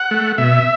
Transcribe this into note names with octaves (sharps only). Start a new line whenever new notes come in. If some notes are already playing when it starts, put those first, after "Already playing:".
Already playing: F#5
A3
B2 E5